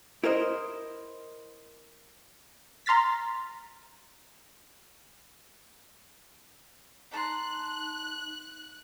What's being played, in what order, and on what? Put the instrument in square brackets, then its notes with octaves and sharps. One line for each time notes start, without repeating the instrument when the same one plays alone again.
[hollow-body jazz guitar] E4 A#4 C5 D#5
[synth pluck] A#5 C6 F6 A6 B6
[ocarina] D#4 [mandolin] A5 A#5 C6 [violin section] F#6